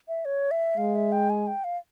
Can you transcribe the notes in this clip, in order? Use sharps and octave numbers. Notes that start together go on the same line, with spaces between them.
E5
C#5
E5
G#3 F5
E5
G5
G#5
G5
F5